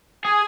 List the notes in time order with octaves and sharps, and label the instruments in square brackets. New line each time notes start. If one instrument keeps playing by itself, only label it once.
[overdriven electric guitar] G#4 [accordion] G#5